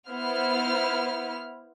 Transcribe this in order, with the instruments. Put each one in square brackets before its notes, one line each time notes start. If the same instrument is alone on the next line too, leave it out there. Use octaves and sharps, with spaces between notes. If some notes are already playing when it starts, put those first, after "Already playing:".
[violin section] B3 E4 C5 F6